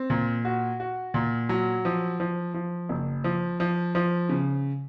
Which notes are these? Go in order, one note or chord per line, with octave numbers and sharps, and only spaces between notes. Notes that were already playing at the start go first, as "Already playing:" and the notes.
Already playing: C4
A#2
F#4
F#4
A#2
F#3
F3
F3
F3
F#1
F3
F3
F3
C#3